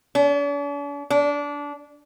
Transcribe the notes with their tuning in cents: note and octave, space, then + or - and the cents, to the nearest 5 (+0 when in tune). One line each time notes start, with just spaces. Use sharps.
D4 -45
D4 -20